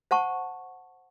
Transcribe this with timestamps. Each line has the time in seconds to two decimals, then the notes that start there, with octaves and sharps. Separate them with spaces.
0.11 C5 F#5 A5 C#6